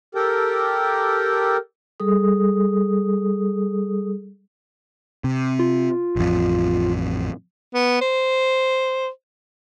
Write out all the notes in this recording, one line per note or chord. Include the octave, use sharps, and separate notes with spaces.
G4 A4 A#4 G5
G3 G#4 A4 D#6
C3
F4
A1 F2
B3
C5